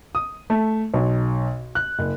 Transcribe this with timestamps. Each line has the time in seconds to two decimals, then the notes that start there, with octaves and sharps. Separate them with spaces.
0.15 D#6
0.50 A3
0.94 B1
1.75 F#6
1.99 F#1